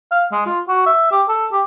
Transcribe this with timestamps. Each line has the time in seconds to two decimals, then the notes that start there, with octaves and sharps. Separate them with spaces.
0.11 F5
0.32 G#3
0.46 F4
0.68 F#4
0.86 E5
1.12 G4
1.28 A4
1.52 G4